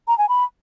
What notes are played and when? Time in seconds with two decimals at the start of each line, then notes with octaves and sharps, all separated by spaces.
0.08 A#5
0.18 G#5
0.29 B5